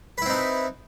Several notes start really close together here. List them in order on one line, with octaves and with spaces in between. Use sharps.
B4 E4 C4 D#4